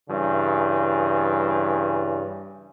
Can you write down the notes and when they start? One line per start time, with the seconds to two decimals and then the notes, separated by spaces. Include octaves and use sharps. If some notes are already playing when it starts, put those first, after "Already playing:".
0.10 G2 C#3 E3